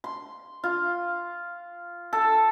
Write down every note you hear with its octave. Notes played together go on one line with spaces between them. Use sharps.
C6
F4
A4